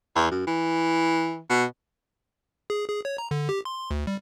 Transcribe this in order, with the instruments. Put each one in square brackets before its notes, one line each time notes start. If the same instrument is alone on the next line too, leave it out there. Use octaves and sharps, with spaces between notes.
[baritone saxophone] E2
F#2
E3
B2
[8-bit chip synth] G#4
G#4
C#5
A#5
D3
G4
C6
D2
G3